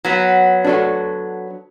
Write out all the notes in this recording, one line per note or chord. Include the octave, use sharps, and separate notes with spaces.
F#3 B3
D4 F#4 A4